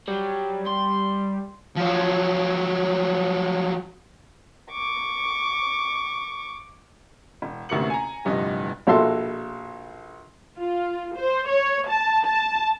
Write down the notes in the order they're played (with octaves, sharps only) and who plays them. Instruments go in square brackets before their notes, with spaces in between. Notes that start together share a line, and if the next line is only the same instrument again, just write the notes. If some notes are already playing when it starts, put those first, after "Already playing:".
[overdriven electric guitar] F#3 [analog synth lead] G3
[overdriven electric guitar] C6
[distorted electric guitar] F3 F#3
[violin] C#6 D6
[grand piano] E1
A1 D2 C3 A#3 C#7 F#7
G#5 A#5
D1 G2 C3 F3 D#5
[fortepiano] A#1 B2 A4 E5 A5 C6
[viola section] F4
C5
C#5
A5
A5